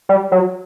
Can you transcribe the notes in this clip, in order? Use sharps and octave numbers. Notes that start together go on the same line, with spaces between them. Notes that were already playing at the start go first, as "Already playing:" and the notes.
G3
F#3